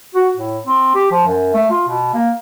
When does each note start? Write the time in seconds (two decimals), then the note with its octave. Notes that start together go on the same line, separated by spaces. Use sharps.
0.15 F#4
0.37 A2
0.66 C4
0.95 G4
1.12 F3
1.26 F#2
1.54 A3
1.70 F4
1.88 B2
2.14 A#3